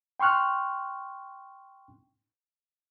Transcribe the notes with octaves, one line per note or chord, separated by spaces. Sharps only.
G5 C6 C#6 F6 F#6